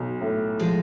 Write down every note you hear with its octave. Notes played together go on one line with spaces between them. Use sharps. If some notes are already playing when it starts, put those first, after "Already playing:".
Already playing: B1
A2
F3 G#3